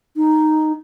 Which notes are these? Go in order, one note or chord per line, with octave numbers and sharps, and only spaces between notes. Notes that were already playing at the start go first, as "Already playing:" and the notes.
D#4